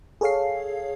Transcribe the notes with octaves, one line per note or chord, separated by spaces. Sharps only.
G#4 A4 C#5 F5 C7